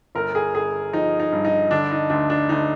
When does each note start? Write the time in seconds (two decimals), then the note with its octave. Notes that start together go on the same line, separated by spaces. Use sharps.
0.15 G1 A#4
0.35 G#4
0.54 G1 G#4
0.93 F3 D#4
1.20 D#4
1.32 G2
1.45 D#4
1.71 D3 D4
1.91 D#4
2.10 D2 D4
2.30 D4
2.49 D2 D#4